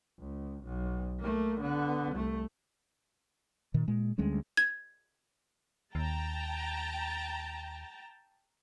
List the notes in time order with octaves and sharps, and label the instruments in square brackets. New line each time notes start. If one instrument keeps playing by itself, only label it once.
[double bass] C#2
B1
A3 A#3
D3 B3
C2 A3
[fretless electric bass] A#2 D#3
A#2 G#3
D2 G3 G#3 C#4
[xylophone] G#6
[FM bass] D#2 [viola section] G5 A5 A#5